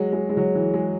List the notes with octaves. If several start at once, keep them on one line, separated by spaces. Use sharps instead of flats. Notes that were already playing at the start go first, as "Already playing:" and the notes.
Already playing: F#3 G#3
G#3
G#3
F#3
E3
G#3